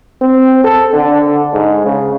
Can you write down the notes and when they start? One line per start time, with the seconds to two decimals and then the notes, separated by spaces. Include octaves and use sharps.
0.21 C4
0.64 A4
0.93 D3
1.53 G#2
1.86 C#3